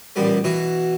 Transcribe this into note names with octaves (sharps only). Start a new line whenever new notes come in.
A1 A#2 G3 B3
B2 E3 F#4